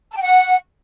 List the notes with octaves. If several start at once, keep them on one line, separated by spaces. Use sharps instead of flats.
A5
G5
F#5